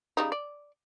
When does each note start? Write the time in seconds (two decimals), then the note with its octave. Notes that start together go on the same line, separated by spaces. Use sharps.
0.17 C#3 G3 D#4
0.32 D5